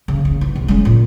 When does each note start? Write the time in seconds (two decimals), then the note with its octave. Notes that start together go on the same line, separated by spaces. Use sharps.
0.08 C#3
0.25 C#3
0.41 E3
0.55 C2
0.68 G#3 C#4
0.85 A#2